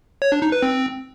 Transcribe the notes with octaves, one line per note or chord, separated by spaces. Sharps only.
C#5
D4
D#4
B4
C4